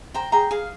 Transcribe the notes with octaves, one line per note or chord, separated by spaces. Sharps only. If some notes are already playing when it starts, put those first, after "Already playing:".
C5 G5 A#5
G#4 G5 A#5
G#4 F5